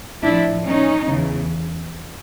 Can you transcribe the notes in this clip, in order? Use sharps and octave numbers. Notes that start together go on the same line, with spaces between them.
A2 F3 D4 E4
C#4 D#4
E2 C#3 E3